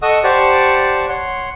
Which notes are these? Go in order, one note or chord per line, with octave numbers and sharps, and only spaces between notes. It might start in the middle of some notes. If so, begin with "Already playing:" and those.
A4 D#5 F#5 C#6 D#6 E6
G4 C5 D5 F#5 A5 C#6
C#5 F#5 C6